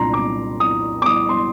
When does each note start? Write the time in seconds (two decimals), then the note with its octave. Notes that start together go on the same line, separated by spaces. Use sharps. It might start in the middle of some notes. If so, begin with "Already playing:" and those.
Already playing: C2 A#2 D4 A#5 C6
0.14 D6
0.60 D#6
1.02 D6
1.06 D#6
1.29 C6